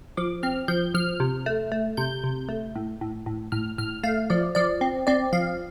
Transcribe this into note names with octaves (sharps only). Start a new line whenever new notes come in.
F3 D6
C4 F6
F3 G6
F3 F6
C3
A3
A3
C3 G6
C3
A3
A2
A2
A2
A2 F6
A2 F6
A3 F5
F3 D5
F3 D5
C4
C4 D5
F3 F5